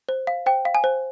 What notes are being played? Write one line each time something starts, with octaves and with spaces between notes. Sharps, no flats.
C5
F5
C5 G5
F5
G#5
C5